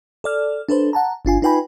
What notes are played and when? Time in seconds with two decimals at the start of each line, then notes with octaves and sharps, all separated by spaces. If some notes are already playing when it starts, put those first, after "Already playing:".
0.24 A4 D5 F6
0.69 D4 A4 B4 C5
0.93 F#5 A5 A#5
1.25 G1 D4 F4 G#5
1.42 D#4 F4 B4 G5 G#5 B5